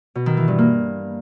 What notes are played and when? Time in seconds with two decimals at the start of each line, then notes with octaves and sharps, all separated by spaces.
0.15 B2
0.26 D#3
0.37 E3
0.48 G2
0.58 A#3